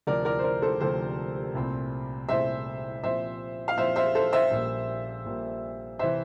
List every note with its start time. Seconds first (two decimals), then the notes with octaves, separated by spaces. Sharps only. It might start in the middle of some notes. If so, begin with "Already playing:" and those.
0.07 D2 C3 F3 A#4 D5
0.25 A#4 D5
0.39 C5
0.44 A#4 D5
0.62 A4 C5
0.81 D2 C3 F3 A4 C5
1.55 C2 A#2 A3 C4
2.29 C2 A#2 A3 C4 C5 E5
3.03 A#2 F3 C4 C5 E5
3.68 F5
3.77 A#2 F3 C4 C5 E5
3.96 C5 E5
4.15 A4 C5
4.32 C5 E5
4.51 A#1 A#2 G3 A#3
5.25 A#1 A#2 G3 A#3
5.99 C3 E3 C5 E5